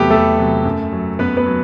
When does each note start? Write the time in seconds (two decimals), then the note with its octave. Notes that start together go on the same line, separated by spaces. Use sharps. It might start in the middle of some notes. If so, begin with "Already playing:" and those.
Already playing: E2 C3 F#3 A3 B3 G4 A4 B4
0.10 E2 A3 A4
0.38 C3 F#3
0.65 F#2
0.93 F#3
1.19 F#2 B3 B4
1.37 B3 B4
1.46 F#3